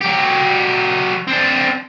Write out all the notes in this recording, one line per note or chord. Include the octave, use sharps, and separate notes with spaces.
F#3 G4
C4 D4